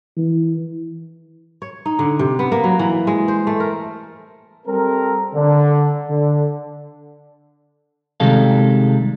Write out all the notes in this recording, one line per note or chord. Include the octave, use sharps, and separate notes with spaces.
E3
C#5
D#4
D3
C3
B3
A#3
F#3
E3
G#3
C5
A3
A#4
G3 C4 A4 A#4
D3
D3
C3 D#3 G3 G#3 A4 F5